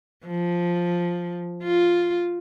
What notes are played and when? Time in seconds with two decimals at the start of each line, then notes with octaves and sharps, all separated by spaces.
0.26 F3
1.63 F4